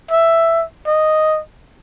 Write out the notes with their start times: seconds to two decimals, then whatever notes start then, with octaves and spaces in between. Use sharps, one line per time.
0.11 E5
0.86 D#5